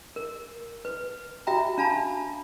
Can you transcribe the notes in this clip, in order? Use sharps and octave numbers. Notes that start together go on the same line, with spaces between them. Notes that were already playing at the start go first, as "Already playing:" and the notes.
A#4
B4
F#4 E5 G5 A#5
D4 F5 A5 B5